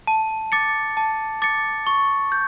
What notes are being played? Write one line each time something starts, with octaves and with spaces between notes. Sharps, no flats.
A5
D6 A6 C#7
A5
D6 A6 C#7
C#6
G6